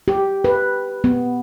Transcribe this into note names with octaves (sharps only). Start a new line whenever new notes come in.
G4
B4
B3